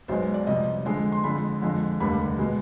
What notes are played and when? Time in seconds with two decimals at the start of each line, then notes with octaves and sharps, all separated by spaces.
0.08 B1 B2 G#3 C5
0.34 D5
0.47 F2 C3 G3 D#5
0.85 F2 D3 G#3
1.12 C6
1.24 F2 D3 G#3 B5
1.62 F2 D3 F3 G#3
2.00 F1 D#2 D3 G3 B5
2.39 B2 G#3